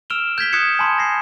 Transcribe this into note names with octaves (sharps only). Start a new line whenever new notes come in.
E6 F6 D7 E7 F7 G7
G6 G#6 B6 G7
D#6 F#6 G#6 B6 C#7 E7
G#5 A5 B5 C6
A#6 C7